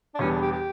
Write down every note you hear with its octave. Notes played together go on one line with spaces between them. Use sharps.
D4
E1 E2 D3 G3 B3 C#4
D4
G4
G4